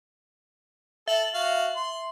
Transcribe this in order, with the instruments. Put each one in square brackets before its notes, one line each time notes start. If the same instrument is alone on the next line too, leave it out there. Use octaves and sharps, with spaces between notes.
[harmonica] A4 [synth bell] E5 F#7
[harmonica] F#4 F5
C6